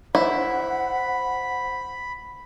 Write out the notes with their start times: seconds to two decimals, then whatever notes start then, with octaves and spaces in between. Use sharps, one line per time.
0.15 E4 C5 F#5 B5